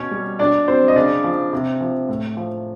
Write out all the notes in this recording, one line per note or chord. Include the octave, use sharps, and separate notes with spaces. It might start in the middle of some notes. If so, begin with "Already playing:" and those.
Already playing: B2 C#4 C#5
G3
B2 D4 D5
F#3 C4 C5
D#5
C#3 D4 D5
F3
C3
F3
A2
F3